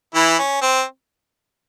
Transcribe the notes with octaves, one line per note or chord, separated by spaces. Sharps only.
E3 E4
C#4
C4